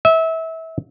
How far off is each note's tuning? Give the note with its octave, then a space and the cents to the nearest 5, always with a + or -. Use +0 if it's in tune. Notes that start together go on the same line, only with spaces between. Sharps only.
E5 -25